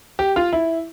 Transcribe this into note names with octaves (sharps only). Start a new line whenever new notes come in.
G4
F4
E4